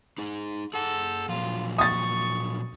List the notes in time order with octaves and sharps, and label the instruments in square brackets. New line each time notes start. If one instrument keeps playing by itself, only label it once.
[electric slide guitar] D#4 G#4
[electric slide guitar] G#4 F#5 [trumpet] A4
[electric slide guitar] A#2 F3 F#3 [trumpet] F4
[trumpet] C#6 [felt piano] D#6 A6